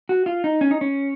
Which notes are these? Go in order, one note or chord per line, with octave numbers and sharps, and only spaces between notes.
F#4
F4
D#4
C#4
D#4
C#4